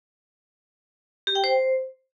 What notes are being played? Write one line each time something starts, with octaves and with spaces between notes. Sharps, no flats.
G4
G5
C5